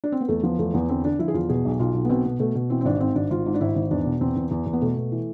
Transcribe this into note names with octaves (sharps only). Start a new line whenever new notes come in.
D4
C4
B3
E2 A3
F3 B3
E2 A3
E2 B3
D3 C4
D3 D4
F3 E4
G#4
E2 F4
B2 G#4
B1
B1 F4
B1
B3
B2 C4
B2 B3
B2 A3
B2
E3 C4
C4
G#1 D4
G#2 C4
G#1 D4
G#1 F4
G#2
D4
G#1 E4
G#1
E2 D4
B2
E2 C4
E2
E2
E2
B3
B2 A3
B2
E3